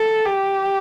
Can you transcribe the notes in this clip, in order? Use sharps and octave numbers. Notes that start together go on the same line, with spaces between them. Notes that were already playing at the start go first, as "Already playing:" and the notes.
Already playing: A4
G4